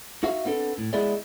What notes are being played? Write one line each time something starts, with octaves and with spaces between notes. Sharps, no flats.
D#4 F#4 E5 F5
B3 C4 D4 A4
A2
G#3 B3 E4 G#4 D5 D#5